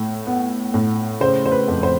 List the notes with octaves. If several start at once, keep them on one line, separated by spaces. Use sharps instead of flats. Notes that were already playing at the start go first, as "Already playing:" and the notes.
Already playing: A2
B3
A2
C#3 C5
C5
B4
F2
C5